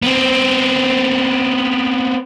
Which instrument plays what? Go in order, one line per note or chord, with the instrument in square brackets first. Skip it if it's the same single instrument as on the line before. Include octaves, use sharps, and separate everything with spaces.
[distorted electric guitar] B3 C4